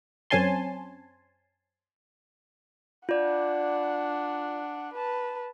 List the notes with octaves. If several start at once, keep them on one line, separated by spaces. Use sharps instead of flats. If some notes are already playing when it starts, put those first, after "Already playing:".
F#2 C4 C#4 G#5 A5 C6
D4 F4 D5 F#5
B4 A5